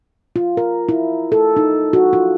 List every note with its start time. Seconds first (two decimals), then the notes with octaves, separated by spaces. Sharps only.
0.36 F4
0.57 A#4
0.89 E4
1.32 A4
1.57 D#4
1.93 F#4
2.13 F4